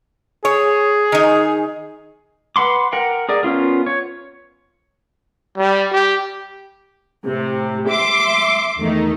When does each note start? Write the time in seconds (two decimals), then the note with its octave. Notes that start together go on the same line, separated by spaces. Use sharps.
0.45 G#4 C#5
1.12 D#3 D#4
2.56 B4 F#5 C6 D6
2.93 A#4 F#5 G5
3.29 G#4 A#4 D5
3.43 B3 C#4 F4 A#4
3.86 C#5
5.58 G3
5.92 G4
7.26 A2 C3
7.88 E5 C6 D6
8.79 E2 D#3 A3 D#4